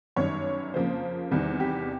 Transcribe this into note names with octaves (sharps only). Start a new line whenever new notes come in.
G1 F#2 D#3 G3 C#5
F2 C#3 F3 A#3 C5
E2 C3 D#3 G3
G4